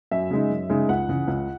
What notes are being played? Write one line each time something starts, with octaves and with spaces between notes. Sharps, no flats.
F#2 E5
C#3 G#3 D#4
F#2
C#3 G#3 D#4
C#2 F#5
C#3 E3
C#2